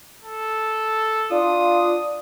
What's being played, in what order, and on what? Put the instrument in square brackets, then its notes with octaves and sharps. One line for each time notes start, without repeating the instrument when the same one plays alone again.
[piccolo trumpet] A4
[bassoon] D4 [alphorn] F4 [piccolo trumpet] D#6